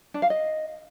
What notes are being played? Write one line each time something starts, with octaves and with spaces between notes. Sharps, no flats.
D4
F5
D#5